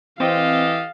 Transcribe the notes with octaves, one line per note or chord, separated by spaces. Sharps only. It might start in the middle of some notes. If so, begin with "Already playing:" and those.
E3 C4 G4 A4 D#5 F5